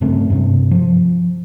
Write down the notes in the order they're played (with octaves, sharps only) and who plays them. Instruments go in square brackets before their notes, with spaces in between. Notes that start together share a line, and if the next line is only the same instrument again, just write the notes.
[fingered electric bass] G2 C#3 A3 C4
G2 C3
F3